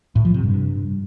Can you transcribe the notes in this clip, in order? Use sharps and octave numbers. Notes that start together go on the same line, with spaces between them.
A2
F3
C3
G2